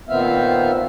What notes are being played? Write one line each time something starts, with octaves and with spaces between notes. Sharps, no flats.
A#2 D#3 B3 C4 E5 F5